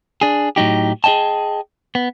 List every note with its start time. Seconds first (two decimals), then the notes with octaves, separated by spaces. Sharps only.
0.21 D4 G#4
0.56 A2 F#3 D#4 G4
1.04 G#4 C5 D#5 G5 A5
1.95 B3